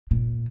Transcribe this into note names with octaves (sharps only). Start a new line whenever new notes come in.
A#2